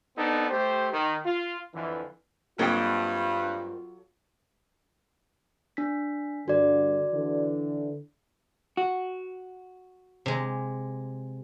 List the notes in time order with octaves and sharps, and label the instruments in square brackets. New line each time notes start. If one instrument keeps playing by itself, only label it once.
[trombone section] B3 C4 D4 D#4 A4
A3 G4 C5
D#3
F4
F2 D3 E3
[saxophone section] G2 [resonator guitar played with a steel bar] F#3 A4 G5 [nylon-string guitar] A#3 C4 D#5 [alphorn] F4
[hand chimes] D4 B6
[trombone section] G2 D3 [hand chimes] F#4 D5
[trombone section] D3 E3
[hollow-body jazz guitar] F#4
[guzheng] C3 G#3